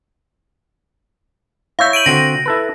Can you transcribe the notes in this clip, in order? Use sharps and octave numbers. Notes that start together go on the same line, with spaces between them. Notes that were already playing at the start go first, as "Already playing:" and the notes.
E4 C#5 E5 F5 G6
D7 D#7 F#7
D3 C4 F#4 A#6
E4 A4 B4